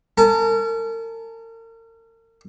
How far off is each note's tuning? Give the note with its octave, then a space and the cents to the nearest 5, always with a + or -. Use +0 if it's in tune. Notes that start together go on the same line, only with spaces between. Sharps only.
A#4 -40 A5 -40